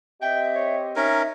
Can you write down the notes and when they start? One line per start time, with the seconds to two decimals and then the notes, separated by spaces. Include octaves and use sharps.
0.22 C4 G4 D#5 E5 G5
0.55 C#5
0.96 C#4 D#4 A#4 E5